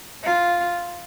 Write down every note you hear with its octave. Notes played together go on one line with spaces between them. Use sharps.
F4